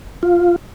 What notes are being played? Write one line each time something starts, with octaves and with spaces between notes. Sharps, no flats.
F4